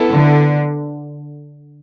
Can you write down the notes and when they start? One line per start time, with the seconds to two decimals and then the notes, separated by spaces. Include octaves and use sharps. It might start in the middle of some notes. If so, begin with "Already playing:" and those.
Already playing: B3 E4 A4
0.12 D3